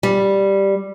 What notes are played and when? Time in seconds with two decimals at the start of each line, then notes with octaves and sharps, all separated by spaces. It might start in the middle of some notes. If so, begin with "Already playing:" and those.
0.03 G3